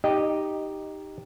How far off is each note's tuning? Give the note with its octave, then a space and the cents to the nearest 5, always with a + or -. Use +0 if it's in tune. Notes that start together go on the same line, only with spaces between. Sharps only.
D#4 +0 G4 +0 D#5 -10